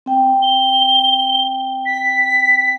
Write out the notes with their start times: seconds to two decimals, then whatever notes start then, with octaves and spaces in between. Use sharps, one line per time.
0.06 C4 G5
0.42 G7
1.86 B6